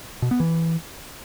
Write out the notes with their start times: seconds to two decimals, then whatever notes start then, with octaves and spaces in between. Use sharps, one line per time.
0.22 B2
0.31 B3
0.40 E3